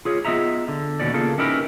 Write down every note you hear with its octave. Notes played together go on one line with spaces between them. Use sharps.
F4 G#4 C#5
B3 F4 G#4 D#5 E5 A#5
D3
D#2 B2 C#4 D5
C#3 A#3 F4 G#4 A4
C#4 D#4 E4 G4 A#4 B4